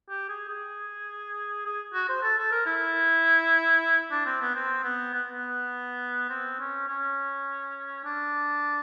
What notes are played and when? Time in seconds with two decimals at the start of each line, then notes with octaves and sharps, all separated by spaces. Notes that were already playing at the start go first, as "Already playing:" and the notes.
0.09 G4
0.29 G#4
0.48 G#4
1.66 G#4
1.94 F#4
2.09 C5
2.23 A4
2.38 A4
2.52 A#4
2.66 E4
4.12 D4
4.26 C4
4.42 B3
4.55 C4
4.84 B3
5.14 B3
5.30 B3
6.30 C4
6.60 C#4
6.89 C#4
8.04 D4